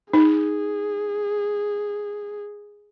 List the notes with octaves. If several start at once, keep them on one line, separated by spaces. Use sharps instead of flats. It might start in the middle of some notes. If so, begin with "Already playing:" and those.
D#4 G#4